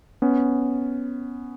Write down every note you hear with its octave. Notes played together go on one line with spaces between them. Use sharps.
B3 C#4